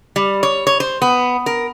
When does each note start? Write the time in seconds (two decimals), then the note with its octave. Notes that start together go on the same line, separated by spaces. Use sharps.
0.16 G3
0.43 C#5
0.67 C#5
0.80 C5
1.02 B3
1.46 A#4